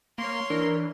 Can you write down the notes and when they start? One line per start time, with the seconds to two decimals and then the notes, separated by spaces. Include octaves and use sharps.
0.18 A#3 C#5 C6
0.50 E3 D4 A#4